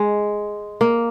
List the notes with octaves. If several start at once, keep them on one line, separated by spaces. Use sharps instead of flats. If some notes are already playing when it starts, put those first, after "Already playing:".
Already playing: G#3
A#3